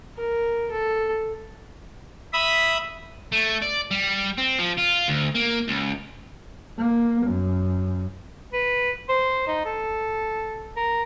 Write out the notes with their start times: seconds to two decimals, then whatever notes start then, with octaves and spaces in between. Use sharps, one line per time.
0.17 A#4
0.71 A4
2.33 E5 B5 D#6
3.32 A3
3.62 D5
3.91 G3
4.38 C4
4.59 F3
4.78 F4
5.09 D2
5.35 A#3
5.68 C#2
6.78 A#3
7.26 F#2
8.53 B4
9.09 C5
9.47 D#4
9.65 A4
10.76 A#4